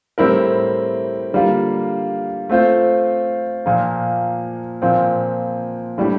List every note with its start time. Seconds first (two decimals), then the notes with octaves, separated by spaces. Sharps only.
0.18 A2 G3 C4 E4 A#4
1.33 D3 G3 A#3 F4
2.49 A3 C4 F4 C5
3.66 A#2 F3 A#3
4.82 A#2 F3 C4
5.98 A2 G3 D4 G4